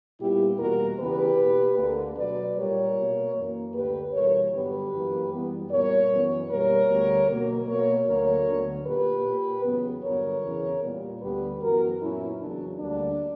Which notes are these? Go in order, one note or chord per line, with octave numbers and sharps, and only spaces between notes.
A#2 G3 B3 E4 G4
E2 B2 G3 A#3 F#4 A#4
E2 C#3 E3 B3 G4 B4
B2 A#3
D2 D3 A#3
B2 F#3 B3 B4 D5
A#2 G3 A#3 A#4 C#5
B2 A#3
F#2 E3 A#3
D2 D3 A#3 G4 B4
E2 B2 G3 A#4 C#5
G2 D3 F#3 B3 G4 B4
F#2 E3 A#3
F#2 E3 G3 B3
A#2 G3 B3 A#4 C#5
F#2 E3 B3
B2 G3 A#3 A#4 C#5
D2 D3 G3 B3
B2 F#3 A#3
B2 A#3 A#4 C#5
D2 D3 F#3 A#3 A#4 C#5
D2 D3 F#3 B3
A#2 A#3 G4 B4
A#2 A#3
E2 C#3 F#3 B3
G2 D3 F#3 B3 A#4 C#5
E2 C#3 E3
A#2 G3 B3
D2 D3 G3 B3 G4 B4
F#2 E3 B3 F#4 A#4
A#2 F#3 B3 C#4 E4
E2 C#3 F#3 D4
D2 D3 G3 A#3 D4